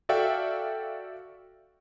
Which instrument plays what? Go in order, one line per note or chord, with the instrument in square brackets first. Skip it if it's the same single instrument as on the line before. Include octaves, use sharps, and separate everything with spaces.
[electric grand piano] F#4 A4 D5 E5 F5 G5